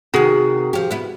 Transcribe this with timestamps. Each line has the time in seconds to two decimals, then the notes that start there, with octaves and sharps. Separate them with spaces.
0.14 C3 D#3 F#4 G#4
0.73 F3 G4
0.91 B3 E4